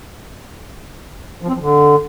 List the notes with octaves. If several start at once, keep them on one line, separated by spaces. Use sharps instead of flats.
F3
C4
F3
D3